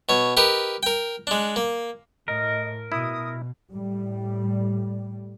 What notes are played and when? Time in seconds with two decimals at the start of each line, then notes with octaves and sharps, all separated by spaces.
0.09 B2 C#5
0.37 G4 A#4 B4 D#5
0.83 A#4 G5
1.27 G#3 D4
1.56 A#3
2.28 A2 A#4 D#5
2.92 B2 E4 D#6
3.74 A2 G3